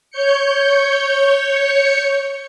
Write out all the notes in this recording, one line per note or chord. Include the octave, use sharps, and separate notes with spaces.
C#5 G6 C#7